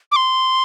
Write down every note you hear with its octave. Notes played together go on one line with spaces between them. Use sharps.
D6
C6